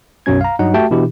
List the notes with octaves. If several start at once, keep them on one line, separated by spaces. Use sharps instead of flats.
B1 F#2 B2 F#3 C#4 G#6
F5 A#5
G2 F#3 D#4 F#5
A3 F#4 G4 E5 G5 A5
B2 E3 D4 E4 G4